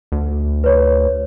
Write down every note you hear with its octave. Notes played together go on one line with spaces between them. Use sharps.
D2
B4 C#5